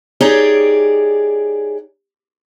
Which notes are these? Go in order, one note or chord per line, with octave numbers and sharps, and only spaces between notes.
D#4 G4 G#4 C#5 D5